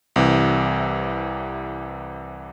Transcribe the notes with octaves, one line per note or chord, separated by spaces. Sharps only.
C2 C3 E3